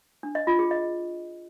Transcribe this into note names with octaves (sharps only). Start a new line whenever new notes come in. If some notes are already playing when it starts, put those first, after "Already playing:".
D4
D#5
F4
G#4
D#5